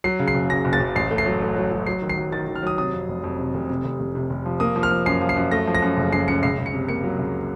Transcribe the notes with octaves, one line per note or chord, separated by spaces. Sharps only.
F#3 C7
C#3
C7
F#1
F#2 A#6
F#1
A6
F#1
A1 C7
A3
C7
F#3
A3
F#3
F#3
F#3 C7
D#3
C7
F#3
D#3 A6
D#3
F6
F#3 D#6
C3 D#6
F2
F1
F2
C3
F1
C3
F1
F1
C3
F1
F3
A#3 D#6
F3
F6
F3
F#2 C7
F3
C7
F#2
A3 A#6
F3
A#6
F#2
F#1
F#2 C7
F#2 C#7
C#2 C7
C#2
C#7
C3
A#3 C#7
F#3
C#2